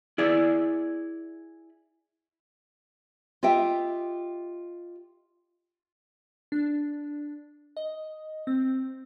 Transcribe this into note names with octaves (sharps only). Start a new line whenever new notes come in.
E4 G#4 D5
F4 G4 D#5 E5 G5
D4
D#5
C4